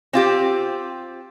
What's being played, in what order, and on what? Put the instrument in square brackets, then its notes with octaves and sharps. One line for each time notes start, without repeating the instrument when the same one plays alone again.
[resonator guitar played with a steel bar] C4 F4 G4